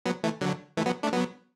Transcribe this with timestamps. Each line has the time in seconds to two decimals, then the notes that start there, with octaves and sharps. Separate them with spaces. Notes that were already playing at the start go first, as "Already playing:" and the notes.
0.05 F#3 B3
0.24 E3 A3
0.41 D3 F#3
0.77 E3 A3
0.86 F#3 B3
1.03 A3 D4
1.13 F#3 B3